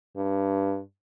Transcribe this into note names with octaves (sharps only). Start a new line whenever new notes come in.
G2